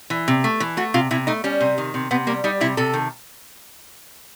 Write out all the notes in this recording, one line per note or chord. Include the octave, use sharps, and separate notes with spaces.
E3
C3
A3
E3
A3 F#4
C3 F4
C3 E4
A3 D#4
G3 C#4
C3
D#3
C3
C3 B3
G3 A#3
G3 D#4
C3 E4
C3 A4
D#3